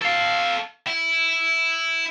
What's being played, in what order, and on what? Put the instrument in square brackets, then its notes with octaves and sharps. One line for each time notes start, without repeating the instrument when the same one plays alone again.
[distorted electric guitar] A4 F5
E4